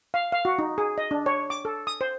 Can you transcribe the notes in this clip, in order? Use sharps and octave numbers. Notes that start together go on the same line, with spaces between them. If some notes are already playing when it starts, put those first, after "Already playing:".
F5
F5
F#4
D#4
G#4
D#5
D4
C#5
D6
A4
D#6
C5